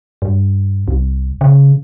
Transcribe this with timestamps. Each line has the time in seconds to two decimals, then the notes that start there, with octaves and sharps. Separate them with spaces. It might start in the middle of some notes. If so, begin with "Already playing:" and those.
0.22 G2
0.88 C2
1.41 C#3